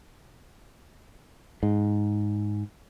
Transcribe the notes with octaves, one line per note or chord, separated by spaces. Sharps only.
G#2